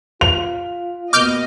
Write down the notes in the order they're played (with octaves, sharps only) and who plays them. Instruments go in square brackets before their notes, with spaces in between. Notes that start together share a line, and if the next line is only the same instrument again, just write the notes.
[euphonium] F4 [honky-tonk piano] F7
[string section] B2 A#3 D#5 [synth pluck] D6 F6 G6